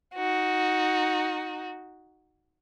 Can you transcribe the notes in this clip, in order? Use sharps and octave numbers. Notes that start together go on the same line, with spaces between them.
D#4 F#4